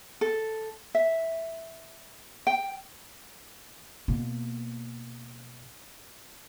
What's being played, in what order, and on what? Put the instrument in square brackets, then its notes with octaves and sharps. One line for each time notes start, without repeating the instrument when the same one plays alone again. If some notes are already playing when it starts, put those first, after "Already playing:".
[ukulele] A4
E5
G5
[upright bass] B2 A#3